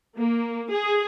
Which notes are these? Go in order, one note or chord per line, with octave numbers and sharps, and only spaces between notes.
A#3
G#4